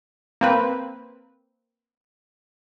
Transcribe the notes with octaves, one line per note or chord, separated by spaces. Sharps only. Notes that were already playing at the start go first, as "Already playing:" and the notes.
A#3 C4 B4